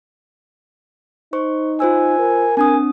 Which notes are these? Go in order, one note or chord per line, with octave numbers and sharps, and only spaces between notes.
D#4 C5 C#6
F4 C5 G#5 E6
A#4
C4 D4 G#5 D#6